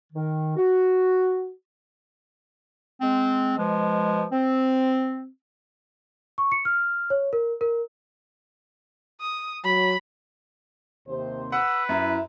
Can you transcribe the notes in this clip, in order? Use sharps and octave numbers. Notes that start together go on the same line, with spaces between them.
D#3
F#4
G#3 C4
B2 F3 G#3
C4
C#6
C#7
F6
C#5
A#4
A#4
D#6
F#3 B5
D#2 C3 C5
B4 F#5 E6
F#2 E4 E5